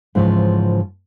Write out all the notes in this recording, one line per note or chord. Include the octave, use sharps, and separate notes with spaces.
G#2 C#3 E3 F3